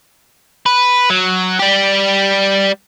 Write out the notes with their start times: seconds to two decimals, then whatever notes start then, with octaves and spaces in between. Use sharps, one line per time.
0.66 B4
1.10 F#3
1.60 G3 G4